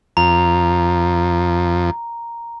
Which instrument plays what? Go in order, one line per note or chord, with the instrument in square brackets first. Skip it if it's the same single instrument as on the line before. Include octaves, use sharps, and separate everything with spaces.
[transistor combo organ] F2 [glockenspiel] A#5